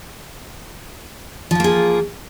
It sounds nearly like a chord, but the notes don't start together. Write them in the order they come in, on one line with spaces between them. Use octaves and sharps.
F3 F4 A#3 G#4